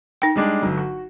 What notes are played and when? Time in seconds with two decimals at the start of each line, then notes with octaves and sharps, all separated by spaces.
0.22 D#4 G5
0.36 G3 G#3 D4
0.63 G1 F#3
0.77 F#4